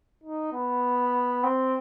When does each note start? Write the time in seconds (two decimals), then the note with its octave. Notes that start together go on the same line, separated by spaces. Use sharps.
0.24 D#4
0.53 B3
1.44 C4